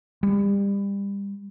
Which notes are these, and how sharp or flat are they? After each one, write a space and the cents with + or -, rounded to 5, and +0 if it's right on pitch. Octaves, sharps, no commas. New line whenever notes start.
G3 +30